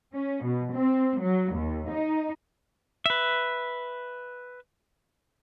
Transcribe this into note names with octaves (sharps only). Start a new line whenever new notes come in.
C#4
B2
C4
F#3
D#2
D#4
B4 E5